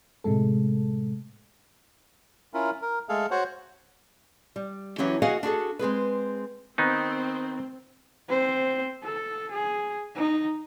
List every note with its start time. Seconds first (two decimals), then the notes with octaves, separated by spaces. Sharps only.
0.24 A2 C3 G#3 A3 A4
2.54 C#4 E4 F4 A#4
2.82 A#4
3.09 G#3 A3 G#4 A4 F5
3.31 F#4 C5 C#5 F#5
4.56 G3
4.98 E3 F#3 C#4 G4
5.22 F#4 G#4 D#5 F5 F#5 G#5
5.43 D4 F#4 G#4 A4
5.79 G#3 C4 G#4 B4
6.78 D#3 B3 C4 D#4
8.29 C4 C5
9.03 A4
9.51 G#4
10.15 D#4